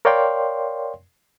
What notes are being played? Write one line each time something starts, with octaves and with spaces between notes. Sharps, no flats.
A#4 C#5 D5 F5 G5 C6